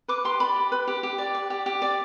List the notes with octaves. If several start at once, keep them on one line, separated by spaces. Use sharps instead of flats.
B4 D6
G4 C6
D5 B5
G4
B4
G4
G4
D5
D5
G4
G4
D5